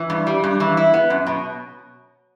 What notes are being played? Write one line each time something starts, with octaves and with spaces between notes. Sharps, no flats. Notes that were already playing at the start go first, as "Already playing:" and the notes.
Already playing: E3
G2
G3
G2
E3
E4
B3
F#2
B2